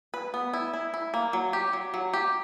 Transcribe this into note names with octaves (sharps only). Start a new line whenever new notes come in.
B4
B3
E4
E4
E4
A#3
F#3
G4
F#3
F#3
G4